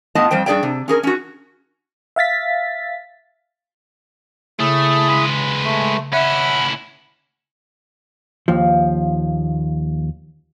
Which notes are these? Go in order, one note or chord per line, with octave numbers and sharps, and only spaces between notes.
A2 B3 F4 D#5 A5
F2 G3 C5 G5
G2 D4 G#4 D5 E5 G5
C3
C#4 G#4 A#4
C#4 F#4
E5 F5 A6 B6
C#3 A3 E4 G#4
G#3 B4
A3
C#4 E4 E5 F#5 B5
D#2 F3